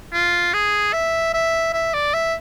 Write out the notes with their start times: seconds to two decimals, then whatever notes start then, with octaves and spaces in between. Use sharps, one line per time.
0.13 F4
0.54 G#4
0.93 E5
1.34 E5
1.73 E5
1.94 D5
2.14 E5